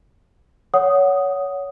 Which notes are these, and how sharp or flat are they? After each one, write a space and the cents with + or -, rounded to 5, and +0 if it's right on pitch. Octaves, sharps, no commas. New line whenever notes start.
C#5 +20 F#5 +0 D#6 +0